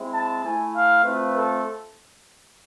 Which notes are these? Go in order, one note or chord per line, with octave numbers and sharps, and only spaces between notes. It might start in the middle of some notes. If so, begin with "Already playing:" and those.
Already playing: G#3 C4 E4
A5
A3 E4 G#5
F5
A3 C4 F4 B4
A4